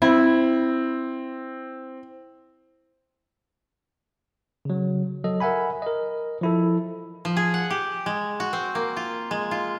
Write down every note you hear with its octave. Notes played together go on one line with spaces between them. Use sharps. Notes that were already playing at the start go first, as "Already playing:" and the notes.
C4 E4
C#3 F#3
F#3 A4 D#5
A#4 E5 F#5 G#5 B5
A#4 D#5
F3 E4 A4
F3
G#4
F#5
G4
G#3
F#4
C4
A#3
F4
G#3
F4